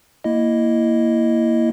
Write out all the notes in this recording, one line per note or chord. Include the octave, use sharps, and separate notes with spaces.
A#3 E4 D#5